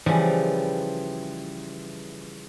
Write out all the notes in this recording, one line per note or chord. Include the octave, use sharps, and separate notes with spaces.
C#3 E3 F3 G3